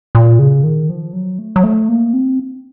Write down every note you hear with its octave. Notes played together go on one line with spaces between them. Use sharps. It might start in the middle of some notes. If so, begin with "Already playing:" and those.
A#2
C#3
D#3
F3
F#3
A3
F#3
A3
A#3
C4